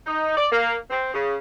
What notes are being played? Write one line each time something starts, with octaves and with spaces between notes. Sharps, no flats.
D#4
D5
A#3
C4
C#3